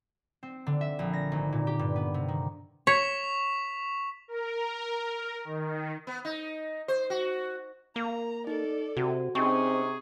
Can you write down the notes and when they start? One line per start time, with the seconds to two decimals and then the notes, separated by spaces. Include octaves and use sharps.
0.43 C4
0.67 D3
0.81 E5
0.99 A#1
1.13 A#6
1.32 G#1
1.52 A#2
1.67 G4
1.79 G2
1.96 B3
2.14 C3
2.28 D#3
2.87 C#5 C#6 B6 F7
4.28 A#4
5.44 D#3
6.07 B3
6.25 D#4
6.88 C5
7.10 F#4
7.96 A#3 A#5
8.47 D#4 A4 D5
8.97 C3 F#4
9.35 C3 C4 C#4 D#4 G#4 C#6